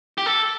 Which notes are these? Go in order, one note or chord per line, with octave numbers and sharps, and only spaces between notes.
G4
A4